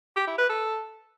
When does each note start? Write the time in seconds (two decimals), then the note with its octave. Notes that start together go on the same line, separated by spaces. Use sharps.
0.16 G4
0.27 E4
0.38 B4
0.49 A4